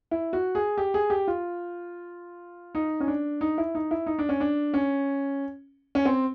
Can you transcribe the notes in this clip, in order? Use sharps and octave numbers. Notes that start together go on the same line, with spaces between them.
E4
F#4
G#4
G4
G#4
G4
F4
D#4
C#4
D4
D#4
E4
D#4
E4
D#4
D4
C#4
D4
C#4
C#4
C4